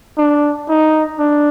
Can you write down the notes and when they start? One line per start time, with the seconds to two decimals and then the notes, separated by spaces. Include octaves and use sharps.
0.18 D4
0.69 D#4
1.19 D4